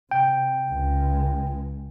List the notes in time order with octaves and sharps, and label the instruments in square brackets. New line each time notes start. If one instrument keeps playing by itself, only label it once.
[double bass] C3 [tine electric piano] G5
[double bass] C#2 G#3